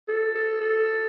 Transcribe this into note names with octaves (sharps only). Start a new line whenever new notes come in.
A4
A4
A4